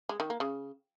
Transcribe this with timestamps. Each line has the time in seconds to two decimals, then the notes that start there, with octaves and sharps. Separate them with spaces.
0.09 G#3
0.20 D#3
0.30 A#3
0.40 C#3